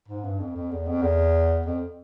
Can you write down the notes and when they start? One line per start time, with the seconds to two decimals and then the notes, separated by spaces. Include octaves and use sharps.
0.08 G#2
0.24 G2
0.40 F2
0.56 F2
0.71 E2
0.87 F2
1.02 E2
1.66 F2